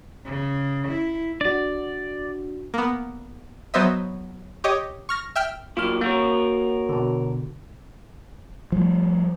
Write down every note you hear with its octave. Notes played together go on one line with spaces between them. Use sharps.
C#3
E4
D4 F#4 D5
A#3 B3
F#3 B3 C5 D#5 E5
G4 C#5 D#5
C#6 F6 A#6
E5 G5 F6
A#2 F#3 A#3 F4 F6
A#3 F#4 A#4 C#5
B2 D3
F3 G3 A3